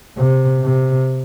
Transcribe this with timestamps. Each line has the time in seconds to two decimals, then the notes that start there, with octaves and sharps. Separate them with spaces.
0.17 C3
0.64 C3